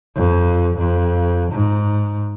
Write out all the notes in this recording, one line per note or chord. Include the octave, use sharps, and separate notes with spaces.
F2
F2
G#2